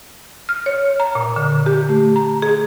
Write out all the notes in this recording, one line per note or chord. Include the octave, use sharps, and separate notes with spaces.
F6
C#5
A#5
A#2
D3
G4
A3
A#5
G#4